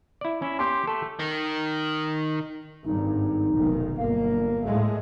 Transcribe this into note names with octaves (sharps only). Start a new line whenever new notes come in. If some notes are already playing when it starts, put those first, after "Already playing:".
E4 D5
C#4 E4
G4 C6
A3 A4
D#3
G#1 G2 D#4
F1 B1 D#3
G1 A#3 F5
A2 G#3 A3